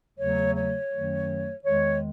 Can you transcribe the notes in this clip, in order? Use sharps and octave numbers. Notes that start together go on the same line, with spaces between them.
E2 C#3 F#3 A3 C#5
C#5
F#2 D#3 F#3 A3
E2 D#3 G#3 C#5